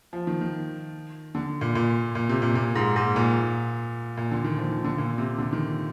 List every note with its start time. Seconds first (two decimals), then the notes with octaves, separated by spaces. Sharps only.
0.13 F3
0.27 D#3
0.41 D#3
1.35 D3
1.61 A#2
1.75 A#2
2.15 A#2
2.29 C3
2.42 A#2
2.55 A#2
2.75 G#2
2.96 G#2
3.16 A#2
4.17 A#2
4.31 D3
4.44 D#3
4.57 F3
4.72 D#3
4.84 D3
4.98 A#2
5.18 C3
5.38 D3
5.53 D#3